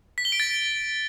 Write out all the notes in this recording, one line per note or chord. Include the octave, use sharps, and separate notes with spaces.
B6
G7
D7
A6
D7